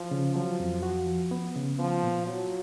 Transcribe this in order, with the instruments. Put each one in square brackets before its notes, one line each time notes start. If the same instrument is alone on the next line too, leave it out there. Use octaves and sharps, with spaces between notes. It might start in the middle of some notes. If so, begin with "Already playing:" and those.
Already playing: [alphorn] F3
[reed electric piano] C#3
[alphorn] F3 [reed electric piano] F#3
[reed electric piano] F2
F#4
F3
B3
C#3
[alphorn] F3 [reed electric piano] B3
[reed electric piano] A#2
[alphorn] F#3 [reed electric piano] F4